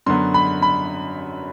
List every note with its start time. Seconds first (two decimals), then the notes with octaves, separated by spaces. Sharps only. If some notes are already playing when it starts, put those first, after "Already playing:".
0.06 F#2 D3 F#3 B3 C6
0.34 B5
0.62 B5